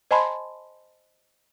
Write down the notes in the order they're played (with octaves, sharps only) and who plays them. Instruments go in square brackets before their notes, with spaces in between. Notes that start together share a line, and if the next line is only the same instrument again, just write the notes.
[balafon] C5 D#5 G#5 A5 B5 C6